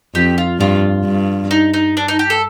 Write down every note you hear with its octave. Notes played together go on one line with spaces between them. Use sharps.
F2 G4
F4
G2 F4
G2
D#4
D#4
D4
D#4
G4
A4